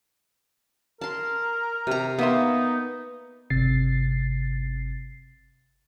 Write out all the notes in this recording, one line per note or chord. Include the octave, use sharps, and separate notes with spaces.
A#4 A5 C6
C3 A#5
A#3 B3 D#4 E5 C6
G1 C3 A6 C7